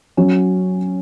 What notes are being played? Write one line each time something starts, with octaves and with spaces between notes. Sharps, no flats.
F#3 C#4 F#4